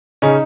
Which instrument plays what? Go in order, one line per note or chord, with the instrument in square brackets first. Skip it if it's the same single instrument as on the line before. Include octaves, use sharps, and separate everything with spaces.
[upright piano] C#3 C#4 [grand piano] D#4